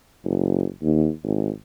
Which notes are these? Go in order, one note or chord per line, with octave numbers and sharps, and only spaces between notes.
F#1
D#2
G#1